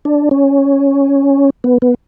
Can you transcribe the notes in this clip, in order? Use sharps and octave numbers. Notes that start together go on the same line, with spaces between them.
D4
C#4
B3
B3